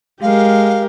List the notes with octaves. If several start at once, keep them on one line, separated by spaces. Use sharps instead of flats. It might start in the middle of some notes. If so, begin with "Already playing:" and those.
G#3 G4 A#4 F5